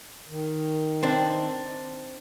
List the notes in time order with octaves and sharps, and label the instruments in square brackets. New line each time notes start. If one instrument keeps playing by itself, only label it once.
[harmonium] D#3
[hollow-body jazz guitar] C4 D4